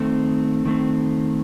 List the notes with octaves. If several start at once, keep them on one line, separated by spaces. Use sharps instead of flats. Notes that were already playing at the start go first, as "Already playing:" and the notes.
Already playing: D#3 A3 C4
D#3 A3 C4